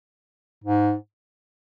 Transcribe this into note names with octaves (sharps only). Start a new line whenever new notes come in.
G#2